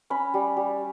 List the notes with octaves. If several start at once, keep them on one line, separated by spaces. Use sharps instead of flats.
C#4 B5
G3
G3